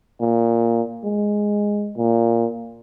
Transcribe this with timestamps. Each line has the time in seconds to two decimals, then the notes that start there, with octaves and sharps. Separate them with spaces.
0.20 A#2
1.04 G#3
1.97 A#2